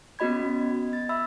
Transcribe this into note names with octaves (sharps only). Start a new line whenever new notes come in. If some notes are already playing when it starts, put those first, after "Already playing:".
B3 C#4 F#4 D#5 B5 G#6
A6
E5 B5 E6